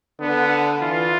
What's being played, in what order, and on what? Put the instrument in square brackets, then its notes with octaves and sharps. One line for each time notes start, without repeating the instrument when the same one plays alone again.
[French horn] D3 [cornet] B3
[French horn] E3 [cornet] F4